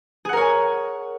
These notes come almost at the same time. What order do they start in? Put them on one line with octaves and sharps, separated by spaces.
G#4 F#5 A#4 C#5 G#5